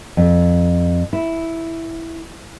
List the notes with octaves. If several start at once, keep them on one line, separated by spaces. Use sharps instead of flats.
F2
E4